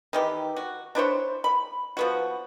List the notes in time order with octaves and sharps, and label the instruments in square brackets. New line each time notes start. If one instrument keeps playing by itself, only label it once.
[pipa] D#3 E3 G4
F#4
D4 E4 C5 C#5
B5
F3 B3 F#4